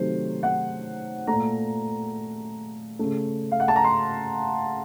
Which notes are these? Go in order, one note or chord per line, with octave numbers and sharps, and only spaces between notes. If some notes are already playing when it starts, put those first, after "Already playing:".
Already playing: C3 D#3 F#3 A3 C5
F#5
A3 A#5
A#2
C#3 A3
F5
F#5
A5
A#5
C6